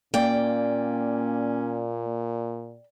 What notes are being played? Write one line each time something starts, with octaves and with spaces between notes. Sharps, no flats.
A#2 A#3 C#4 D5 G5